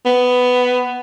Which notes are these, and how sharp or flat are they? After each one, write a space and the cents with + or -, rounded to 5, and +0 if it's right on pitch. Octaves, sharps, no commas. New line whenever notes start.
B3 +10